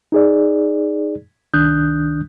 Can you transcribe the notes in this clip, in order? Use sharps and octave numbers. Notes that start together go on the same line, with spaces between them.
D#4 G#4 D5
C2 D#3 D4 D#6 F#6 G6